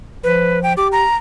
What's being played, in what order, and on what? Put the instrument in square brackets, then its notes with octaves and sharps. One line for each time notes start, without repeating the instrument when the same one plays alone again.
[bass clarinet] F3 [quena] B4
[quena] G5
[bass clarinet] G4 [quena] D6
[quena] A#5